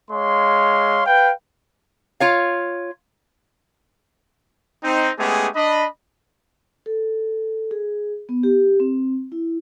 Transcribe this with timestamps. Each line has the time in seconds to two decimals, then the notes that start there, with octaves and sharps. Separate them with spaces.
0.11 G#3 C#5 F5 C6
1.06 B4 F5 G5
2.20 F4 C#5 F5
4.83 C4 D#4
5.18 G#3 A3 B3 C#4 G4 G#4
5.55 D4 D#5 B5
6.86 A4
7.71 G#4
8.29 B3
8.43 G4
8.80 C4
9.32 E4